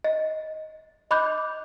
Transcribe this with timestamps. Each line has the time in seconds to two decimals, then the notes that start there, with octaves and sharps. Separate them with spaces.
0.04 D#5
1.11 D#5 B5 D6 F#6 G6